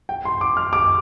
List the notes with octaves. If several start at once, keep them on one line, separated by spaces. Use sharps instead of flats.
G5
C6
D6
F6
D6